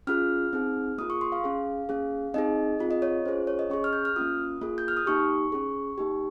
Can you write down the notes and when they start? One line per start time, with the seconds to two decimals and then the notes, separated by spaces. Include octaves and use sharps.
0.07 C#4 F4 G#4 F6
0.53 C4 D#4 G#4
0.98 A#3 F4 G#4 D#6
1.10 C#6
1.21 C6
1.32 F5
1.44 C#4 G#4
1.89 A#3 C#4 G#4
2.34 C4 D#4 G#4 D#5
2.79 C4 F4 G#4
2.91 D#5
3.02 C#5
3.25 C#4 F4 G#4 C5
3.47 C#5
3.59 D#5
3.70 C#4 G#4 C#6
3.84 F6
3.93 G6
4.05 F6
4.16 A#3 C#4 F4 D#6
4.61 A#3 F4 G#4
4.78 G6
4.88 F6
4.97 D#6
5.06 A#3 D#4 G4 C#6
5.52 C#4 G#4
5.98 A#3 D#4 G4